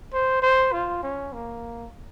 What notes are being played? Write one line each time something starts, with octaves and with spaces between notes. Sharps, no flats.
C5
C5
F4
C#4
A#3